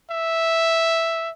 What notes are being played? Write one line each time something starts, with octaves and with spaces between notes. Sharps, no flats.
E5